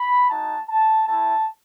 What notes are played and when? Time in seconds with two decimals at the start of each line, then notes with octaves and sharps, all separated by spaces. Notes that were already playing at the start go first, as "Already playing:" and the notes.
Already playing: B5
0.30 G#3 D#4 F#4 A5
0.68 A5
1.07 A3 E4 A5